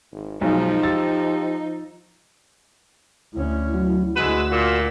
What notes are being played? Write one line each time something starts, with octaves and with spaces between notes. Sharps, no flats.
G#1
B1 F3 G#3 D#4
G4 E6 A6
D2 C#4 E4
F#3
D2 D3 G#3 F#4 B4 E6
A#2